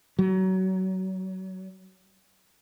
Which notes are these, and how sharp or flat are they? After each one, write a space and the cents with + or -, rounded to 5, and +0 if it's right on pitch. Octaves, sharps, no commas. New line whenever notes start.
F#3 +25